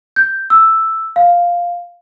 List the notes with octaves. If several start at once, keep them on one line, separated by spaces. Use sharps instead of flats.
G6
E6
F5